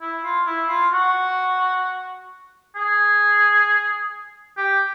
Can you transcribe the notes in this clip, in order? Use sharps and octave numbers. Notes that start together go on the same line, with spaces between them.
E4
F4
E4
F4
F#4
G#4
G4